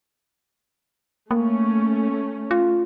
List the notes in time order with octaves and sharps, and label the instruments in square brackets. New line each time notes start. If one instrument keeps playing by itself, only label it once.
[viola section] A3 C#4 [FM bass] A#3
[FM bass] F4